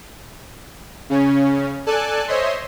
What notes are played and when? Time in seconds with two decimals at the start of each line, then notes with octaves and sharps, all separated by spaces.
1.09 C#3 C#4
1.87 A4 D5 G#5 A5 F#6
2.28 C5 C#5 D#5 E5 C6